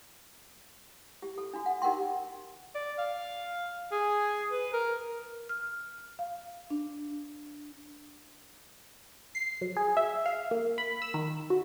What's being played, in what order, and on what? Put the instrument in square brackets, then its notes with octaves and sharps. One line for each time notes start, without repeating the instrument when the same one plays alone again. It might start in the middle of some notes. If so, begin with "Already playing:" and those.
[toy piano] G4
A4
D4 F#4
F#5
D#4 G4 A#4 F#5 G5 C6
[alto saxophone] D5
F5
G#4
B4
A#4
[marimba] F6
F5
D4
[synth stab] C7
F#3
G#4
E5
F5
A#3
B5
E6
D#3
F#4